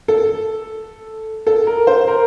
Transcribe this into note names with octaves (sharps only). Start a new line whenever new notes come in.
A4
A4
A#4
C5
A#4